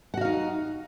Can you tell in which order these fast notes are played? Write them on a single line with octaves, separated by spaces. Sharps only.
F#5 F#4 F5 D#4